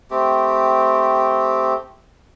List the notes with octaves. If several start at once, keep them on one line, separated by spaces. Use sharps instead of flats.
A3 C4 G4